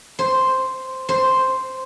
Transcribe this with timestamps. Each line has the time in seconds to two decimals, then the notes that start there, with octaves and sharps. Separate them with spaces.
0.19 C5
1.09 C5